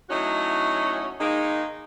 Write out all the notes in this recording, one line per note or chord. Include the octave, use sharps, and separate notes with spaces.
F#3 A3 C#4 D#4 E4 F#4
D#3 G#3 A#3 D#4